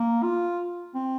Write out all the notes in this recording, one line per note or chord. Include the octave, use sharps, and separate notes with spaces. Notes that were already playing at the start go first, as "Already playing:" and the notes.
Already playing: A#3
F4
C4